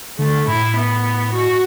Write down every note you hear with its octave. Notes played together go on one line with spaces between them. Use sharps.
D3 A3
A2 E4
B3
F#4